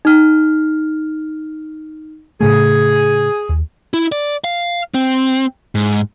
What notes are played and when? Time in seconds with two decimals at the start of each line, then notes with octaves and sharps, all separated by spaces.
0.05 D#4 F6
2.41 A2 C#3 A3 G#4
3.49 D#2
3.94 E4
4.12 D5
4.44 F5
4.94 C4
5.75 G#2